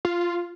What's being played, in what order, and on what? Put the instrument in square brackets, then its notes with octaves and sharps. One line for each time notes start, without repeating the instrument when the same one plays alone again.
[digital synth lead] F4